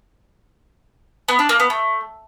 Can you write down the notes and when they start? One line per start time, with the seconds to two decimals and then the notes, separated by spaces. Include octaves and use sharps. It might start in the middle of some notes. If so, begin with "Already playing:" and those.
1.28 B3
1.39 D4
1.49 A#3
1.60 B3
1.70 A3